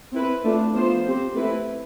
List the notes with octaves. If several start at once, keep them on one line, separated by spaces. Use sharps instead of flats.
C4 E4 B4
A3 D4 F4
F3 B3 F4 C5
C4 G4 C5
A3 C4 E4 B4